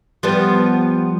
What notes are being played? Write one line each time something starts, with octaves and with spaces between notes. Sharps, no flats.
F3 G3 B3